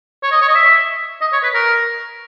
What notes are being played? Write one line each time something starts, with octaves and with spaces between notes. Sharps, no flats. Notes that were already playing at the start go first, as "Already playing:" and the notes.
C#5
D#5
C#5
D#5
E5
D#5
C#5
B4
A#4